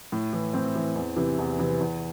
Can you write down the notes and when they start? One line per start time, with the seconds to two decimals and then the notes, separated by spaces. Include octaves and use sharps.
0.12 A2
0.33 E3
0.53 A2 C4
0.76 E3
0.96 E2
1.16 C3 E3
1.38 E2
1.59 C3 E3
1.80 E2